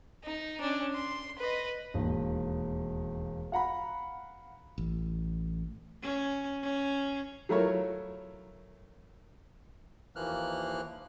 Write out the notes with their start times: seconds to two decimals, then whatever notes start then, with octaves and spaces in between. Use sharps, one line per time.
0.24 D#4
0.60 C#4 D4
0.94 C6
1.39 B4 D#5
1.94 E1 D#2
3.52 F5 F#5 A#5 B5
4.78 A1
6.03 C#4
6.63 C#4
7.49 F#3 A3 E4 F4 A#4 C#5
10.16 D#2 E3 F3 A#3 F6 F#6